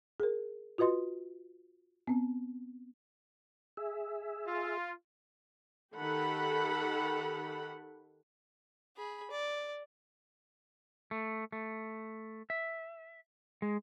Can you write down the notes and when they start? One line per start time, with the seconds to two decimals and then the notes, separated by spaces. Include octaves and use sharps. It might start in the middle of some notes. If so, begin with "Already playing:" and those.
0.20 G#4 A#4
0.78 F4 F#4 B4 D#5 C6
2.07 B3 C4
3.77 G#4 E5
4.46 F4
5.96 D#3 G4 A4 F#5 B5
8.97 G#4 B5
9.31 D5
11.11 A3
11.52 A3
12.50 E5
13.62 G#3